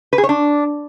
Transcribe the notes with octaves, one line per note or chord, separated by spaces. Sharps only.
B4
G#4
C#5
D4